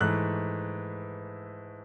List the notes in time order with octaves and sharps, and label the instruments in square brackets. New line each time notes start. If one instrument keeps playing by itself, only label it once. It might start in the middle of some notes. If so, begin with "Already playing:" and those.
[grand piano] G#2 E3 A3 F#6